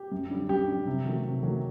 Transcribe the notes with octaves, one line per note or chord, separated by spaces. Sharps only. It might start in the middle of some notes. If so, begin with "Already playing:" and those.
Already playing: G4
F#2
D3 G3
F#2 G4
D3 G3
C3
D#3 F#3 A3
C3
D#3 F#3 A3